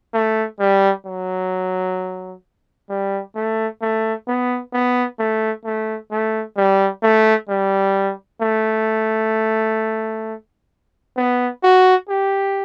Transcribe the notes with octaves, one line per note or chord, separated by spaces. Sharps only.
A3
G3
F#3
G3
A3
A3
B3
B3
A3
A3
A3
G3
A3
G3
A3
B3
F#4
G4